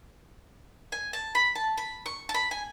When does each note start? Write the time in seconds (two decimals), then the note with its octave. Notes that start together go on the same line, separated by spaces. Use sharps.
0.92 G#5
1.13 A5
1.35 B5
1.55 A5
1.78 B5
2.06 C#6
2.29 A5
2.34 B5
2.51 G#5